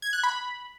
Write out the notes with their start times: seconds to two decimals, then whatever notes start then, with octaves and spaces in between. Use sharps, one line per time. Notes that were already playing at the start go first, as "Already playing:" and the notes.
0.02 G#6
0.13 F#6
0.23 B5